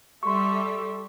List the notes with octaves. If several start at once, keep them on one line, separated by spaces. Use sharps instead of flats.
G3 A4 E5 C6 C#6